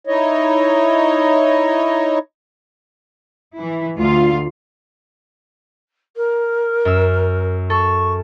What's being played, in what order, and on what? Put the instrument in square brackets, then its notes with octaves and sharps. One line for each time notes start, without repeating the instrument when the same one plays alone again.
[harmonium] D#4 E4 C#5 D#5
[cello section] E3 E4
D2 D3 F4 F5
[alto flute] A#4
[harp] F#2 E6
[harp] A4 [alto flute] C#6